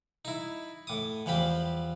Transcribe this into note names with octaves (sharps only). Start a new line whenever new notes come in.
D#4 E4
A2 D6 D#6
E2 F3 G3 C5 B5 D6